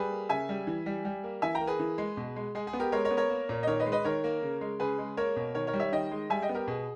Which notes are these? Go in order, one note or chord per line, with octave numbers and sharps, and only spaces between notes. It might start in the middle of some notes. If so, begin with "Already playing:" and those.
Already playing: G3 G#4 B4
A#3
C#3 E5 G#5
G3
E3
G3
G3
A#3
E3 E5 G#5
G5 A#5
A#3
G#4 B4
E3
G#3
B2
G#3
G#3 G#4
G#4
B3
G4 A#4
G#3 A#4 C#5
A#4 C#5
B3
A#4 C#5
A#3
A#2
D#5
D#3 A#4 C#5
B4 D#5
G#3
B4 D#5
D#3 A#4 C#5
A#3
C#3
G#3
C#3 G#4 B4
G#3
A#3 A#4 C#5
B2
D#3 A#4 C#5
A#4 C#5
G3
C#5 E5
D#3 D#5 G5
G#3
G3 E5 G#5
D#5 G5
B3
G4 A#4
B2 G#4